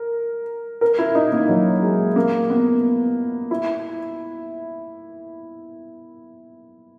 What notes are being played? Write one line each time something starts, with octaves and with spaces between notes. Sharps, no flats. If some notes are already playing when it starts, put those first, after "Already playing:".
Already playing: A#4
A#4
E4
D#4
A#3
F#3
G#3
A#3
B3
E4